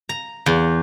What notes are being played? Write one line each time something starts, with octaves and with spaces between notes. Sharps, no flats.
A#5
E2